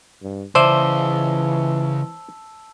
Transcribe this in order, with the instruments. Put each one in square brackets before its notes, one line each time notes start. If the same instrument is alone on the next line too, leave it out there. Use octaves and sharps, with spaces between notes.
[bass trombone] G2
[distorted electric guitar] C#2 [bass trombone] E3 [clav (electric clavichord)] C5 D5 E5 [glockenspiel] A5 E6 G7